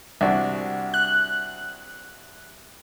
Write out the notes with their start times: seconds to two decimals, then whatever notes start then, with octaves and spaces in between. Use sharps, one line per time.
0.21 C2 D4 F#4
0.94 F#6